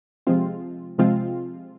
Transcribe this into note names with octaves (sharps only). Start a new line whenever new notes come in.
C3 F3 G#3 C4 F4
C3 F3 G#3 C4 F4